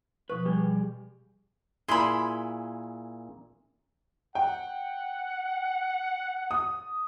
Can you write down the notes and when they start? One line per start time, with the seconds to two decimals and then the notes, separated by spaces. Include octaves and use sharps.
0.30 B2 F3 B4 C#6
0.45 G3 G4 G#4
1.88 A#2 E4 G#4 B5 C6
4.35 F#5 G5
6.51 D#6